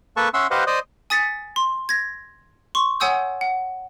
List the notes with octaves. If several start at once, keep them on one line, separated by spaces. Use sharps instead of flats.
A#3 A4 B4 A5 C#6
C#4 E5 F#5 C6 E6
G4 B4 C5 D#5 F5 F#5
C5 D5 D#5 D#6
G#5 D#6 A6 B6 C#7
C6
G#6 A#6
C6 C#6
C#5 F#5 G#5 D#6 E6 G6
F#5